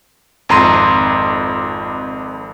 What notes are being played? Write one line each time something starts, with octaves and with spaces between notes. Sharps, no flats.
G#1 F2 A#5 C6 D#7